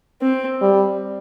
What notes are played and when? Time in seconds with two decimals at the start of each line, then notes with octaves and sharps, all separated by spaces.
0.21 C4
0.61 G3